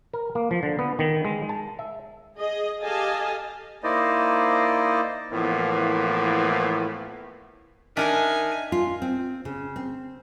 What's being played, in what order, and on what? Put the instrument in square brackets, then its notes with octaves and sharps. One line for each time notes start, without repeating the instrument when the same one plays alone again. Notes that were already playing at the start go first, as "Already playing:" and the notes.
[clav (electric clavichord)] A#4
A#3
F3
D3
B3
D#3
G#3
A5
E5
[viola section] G#4 D#5
G4 A4 D#5 F5 G#5 A5
[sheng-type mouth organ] A#3 D#4 E4 C5 D5 D#5
[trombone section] A2 E3 F3 A#3 B3
[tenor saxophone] D#3 [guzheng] D4 A#4 D#5 [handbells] E5 B6 [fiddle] G#5
[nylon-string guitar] F4
C4
C#3
C4